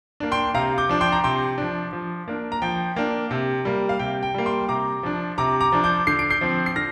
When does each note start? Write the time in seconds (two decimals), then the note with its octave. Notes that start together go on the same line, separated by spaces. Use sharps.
0.20 A#3 D4
0.32 G5 C6
0.54 C3 F5 A#5
0.78 D6 G6
0.89 F3 D4
1.01 G5 C6
1.12 A#5
1.24 C3 G5 C6
1.58 F3 D4
1.93 F3
2.28 A#3 D4
2.52 A#5
2.62 F3 G5
2.96 A#3 D4
3.31 C3
3.65 G3 A#3
3.89 F5
3.99 C3 G5
4.23 G5
4.34 G3 A#3
4.46 G5 C6
4.69 C3 A#5 D6
5.03 F3 D4
5.38 C3 A#5 D6
5.61 A#5 D6
5.72 F3 D4
5.84 D6 G6
6.07 D3 C7
6.19 D7
6.30 G6 C7
6.41 F3 C4
6.66 C7
6.76 D3 F6 A#6